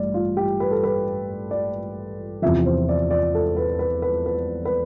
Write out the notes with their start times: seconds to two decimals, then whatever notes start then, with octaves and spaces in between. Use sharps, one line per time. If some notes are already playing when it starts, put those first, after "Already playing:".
Already playing: A1 G2 D5
0.14 F4
0.37 G4
0.60 B4
0.71 A4
0.83 B4
1.51 D5
2.42 E2 C3 F3 E5
2.66 C5
2.89 D5
3.11 D5
3.35 A4
3.57 B4
3.79 B4
4.02 B4
4.26 B4
4.65 B4